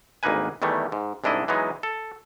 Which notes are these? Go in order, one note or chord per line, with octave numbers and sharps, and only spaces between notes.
G#1 D2 A#3 D#4 B4 G#5
E2 D#3 E3 G3 A3
G#2
C2 G#2 D4 E4 D#5
E3 F#3 G#3 B3 D#4
A4